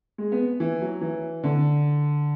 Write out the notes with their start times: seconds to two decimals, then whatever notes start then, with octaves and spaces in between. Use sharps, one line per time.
0.18 G#3
0.32 B3
0.60 E3
0.81 F#3
1.01 E3
1.43 D3